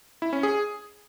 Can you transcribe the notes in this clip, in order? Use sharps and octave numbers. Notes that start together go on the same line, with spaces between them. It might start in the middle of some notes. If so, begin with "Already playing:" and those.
E4
C#4
G#4